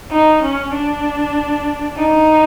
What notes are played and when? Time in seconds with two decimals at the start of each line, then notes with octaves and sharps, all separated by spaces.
0.11 D#4
0.43 C#4
0.74 D4
1.97 D#4